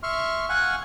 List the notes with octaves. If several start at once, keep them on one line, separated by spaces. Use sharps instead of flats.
E5 C6 C#6 F6
F5 F#5 G#5 C#6 F#6